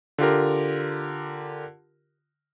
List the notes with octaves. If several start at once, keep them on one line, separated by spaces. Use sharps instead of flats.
D3 F4 G4 A#4